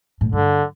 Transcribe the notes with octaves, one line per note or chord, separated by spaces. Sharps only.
A2
G2 D3